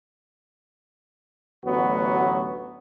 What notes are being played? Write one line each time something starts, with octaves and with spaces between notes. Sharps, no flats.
A1 D2 F#3 B3 F#4